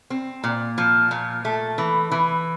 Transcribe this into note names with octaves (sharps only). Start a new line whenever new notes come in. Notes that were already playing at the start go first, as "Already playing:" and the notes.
C4
A#2
F3
A#2
A3
E3
E3